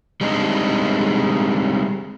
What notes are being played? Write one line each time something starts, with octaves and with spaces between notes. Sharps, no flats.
G3 G#3 C4 D4 D#4